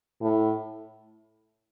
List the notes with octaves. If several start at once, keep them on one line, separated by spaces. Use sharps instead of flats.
A2